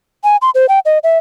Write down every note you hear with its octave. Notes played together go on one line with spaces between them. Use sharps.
G#5
C6
C5
G5
D#5
E5